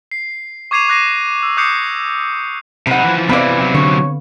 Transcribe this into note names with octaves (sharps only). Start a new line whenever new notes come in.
C7
C#6 D6 G#6 C7 D#7 F7
D6 F#6 A#6 C7 D#7
E6
D6 D#6 F#6 G6 C7 C#7
C3 D#4 F#5 B5
E3 F3
C3 E3 B3 C4 D5 F5 B5
C3 F#3
D3 C#5